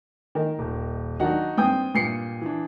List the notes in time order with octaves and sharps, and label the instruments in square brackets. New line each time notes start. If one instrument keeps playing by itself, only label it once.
[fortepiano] D#3 A#4
[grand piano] D#1
[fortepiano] D#3 F#3 D4 [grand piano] D#4 F#4 F#5
[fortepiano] G2 C4 [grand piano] G5 D#6 G6
[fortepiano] G2 [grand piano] A#2 C7 C#7
[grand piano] E3 D4